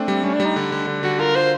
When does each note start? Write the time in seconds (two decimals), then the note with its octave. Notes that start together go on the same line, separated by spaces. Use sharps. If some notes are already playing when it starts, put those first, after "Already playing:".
Already playing: A3 C4 D4
0.08 G3
0.23 G3 C#4
0.34 D4
0.40 G3
0.45 D#4
0.56 D3
0.72 D3
0.87 D3
1.03 D3 F#4
1.19 F4 A#4
1.36 F4 C5